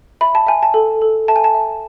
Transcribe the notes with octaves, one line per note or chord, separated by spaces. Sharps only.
E5 B5
A5
E5 G#5
A5
A4
A4
E5 A5
G#5
A5
E5